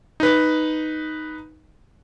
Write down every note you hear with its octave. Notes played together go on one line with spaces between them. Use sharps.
D#4 B4